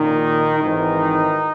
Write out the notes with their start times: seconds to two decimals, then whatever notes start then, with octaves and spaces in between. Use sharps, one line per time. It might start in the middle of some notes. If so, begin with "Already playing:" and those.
Already playing: A#1 A#2 D#3 D#4
0.60 G#1 G#2 D#3 E3 D#4